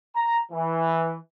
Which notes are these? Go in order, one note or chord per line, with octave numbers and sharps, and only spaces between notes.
A#5
E3